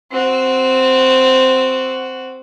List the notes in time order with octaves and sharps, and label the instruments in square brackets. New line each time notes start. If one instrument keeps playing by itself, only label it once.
[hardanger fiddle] C4 F#4